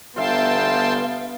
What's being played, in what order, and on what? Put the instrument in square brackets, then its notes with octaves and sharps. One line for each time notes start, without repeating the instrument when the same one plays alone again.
[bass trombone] G1 [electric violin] B3 F5 [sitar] F4 E5 [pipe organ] G5 A5 C6